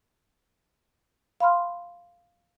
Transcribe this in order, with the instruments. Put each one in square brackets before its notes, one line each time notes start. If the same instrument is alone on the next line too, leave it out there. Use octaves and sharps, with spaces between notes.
[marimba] F5 B5 C6 F6